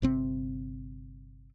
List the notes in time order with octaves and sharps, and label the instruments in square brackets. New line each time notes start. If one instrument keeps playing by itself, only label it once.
[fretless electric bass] G1 C3 C4